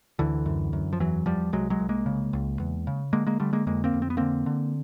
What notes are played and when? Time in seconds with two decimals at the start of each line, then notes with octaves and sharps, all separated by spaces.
0.19 D2 D3 E3
0.46 F#2
0.73 F#2
0.93 F3
1.00 E2 E3 F#3
1.26 E2 F3 G3
1.53 C2 F#3 G#3
1.70 F#3 G#3
1.80 C2
1.89 G#3 A#3
2.06 C#3
2.33 C#2
2.60 E2
2.87 C#3
3.13 D3 G#3 A#3
3.27 G#3 A#3
3.40 D3 G3 A3
3.53 G#3 A#3
3.66 F2 G#3 A#3
3.84 A#3 C4
3.94 F2
4.02 C4
4.10 B3
4.17 D3 A#3 C4
4.46 D3